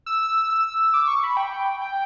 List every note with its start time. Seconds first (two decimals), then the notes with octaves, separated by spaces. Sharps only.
0.06 E6
0.50 E6
0.94 D6
1.08 C#6
1.24 B5
1.37 G5
1.81 G5